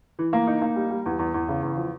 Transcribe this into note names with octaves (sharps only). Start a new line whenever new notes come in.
E3
A#3
D#4
A#3
G3
G3
E2
E2
E2
C#3
E2
F3